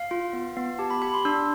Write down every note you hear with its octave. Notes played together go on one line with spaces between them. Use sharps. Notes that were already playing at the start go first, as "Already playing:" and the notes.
Already playing: F5
F4
B3
B3
G4 A5
B5
G4 B5
C6
D4 E6